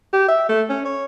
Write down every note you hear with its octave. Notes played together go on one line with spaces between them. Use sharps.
G4
E5
A3
C#4
C#5